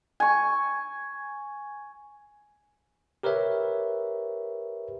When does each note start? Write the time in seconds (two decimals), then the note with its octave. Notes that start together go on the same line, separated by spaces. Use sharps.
0.20 G#5 C#6
3.23 G4 A#4 B4 C#5 E5